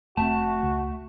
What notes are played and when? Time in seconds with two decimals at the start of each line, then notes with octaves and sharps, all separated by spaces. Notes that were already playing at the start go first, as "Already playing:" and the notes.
0.17 F1 A3 C4 F#4 A5
0.63 C#2